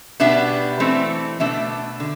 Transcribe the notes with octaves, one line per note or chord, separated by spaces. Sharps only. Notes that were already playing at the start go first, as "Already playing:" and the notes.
B2 G3 B3 D4 E5
E3 A3 C4
B2 A3 D4 E5
D3